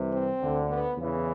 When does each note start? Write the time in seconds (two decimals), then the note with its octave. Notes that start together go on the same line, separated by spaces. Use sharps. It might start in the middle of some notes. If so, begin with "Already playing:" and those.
Already playing: C2 C3 E3
0.13 C4
0.41 D2 D3
0.69 B3
0.97 E2 C#3 E3